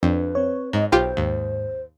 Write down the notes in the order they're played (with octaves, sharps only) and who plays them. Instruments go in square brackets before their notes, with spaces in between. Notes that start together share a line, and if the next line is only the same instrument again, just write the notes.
[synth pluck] F2 [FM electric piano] D4 [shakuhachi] B4
[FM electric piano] C4 C#5
[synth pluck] G#2 [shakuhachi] D#5
[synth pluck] B1 F4 G4 [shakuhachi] C5 [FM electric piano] G5
[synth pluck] D#2 [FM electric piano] G#2